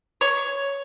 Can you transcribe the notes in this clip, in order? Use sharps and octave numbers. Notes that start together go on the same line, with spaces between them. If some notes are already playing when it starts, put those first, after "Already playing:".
C#5